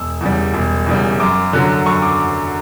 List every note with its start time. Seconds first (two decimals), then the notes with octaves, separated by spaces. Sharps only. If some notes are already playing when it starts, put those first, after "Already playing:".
Already playing: E1 E6
0.21 E2 C#3 G3
0.54 E1
0.87 E2 C#3 G3
1.20 F#2 D6
1.53 D3 F#3
1.86 F#2 C#6
2.02 D6